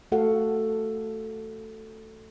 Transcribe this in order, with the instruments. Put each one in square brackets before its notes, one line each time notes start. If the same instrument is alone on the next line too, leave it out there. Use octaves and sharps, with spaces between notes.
[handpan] A3 F#4 A4 F5 F#5